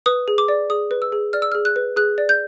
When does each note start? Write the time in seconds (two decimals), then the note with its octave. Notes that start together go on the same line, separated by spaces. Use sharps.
0.06 B4 D#6
0.28 G#4
0.38 D6
0.48 D5
0.70 G#4 D#6
0.91 B4
1.02 E6
1.12 G#4
1.33 D5 F6
1.42 E6
1.52 F6
1.55 G#4
1.65 F#6
1.76 B4
1.96 G#4 F#6
2.18 D5
2.29 G6